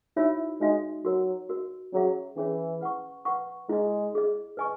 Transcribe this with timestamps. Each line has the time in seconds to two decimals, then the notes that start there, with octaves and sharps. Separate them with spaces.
0.17 D#4 E4 F#4 C#5 E5
0.61 G#3 D#4 F#4 C#5 E5
1.05 F#3 F#4 A#4 D#5
1.49 F#4 A#4 D#5
1.93 F#3 C#4 G#4 C#5 E5
2.37 E3 C#4 G#4 C#5 E5
2.81 B4 F#5 C#6
3.25 B4 F#5 C#6
3.69 G#3 E4 G#4 D#5
4.13 E4 G#4 D#5
4.57 B4 D#5 G#5 C#6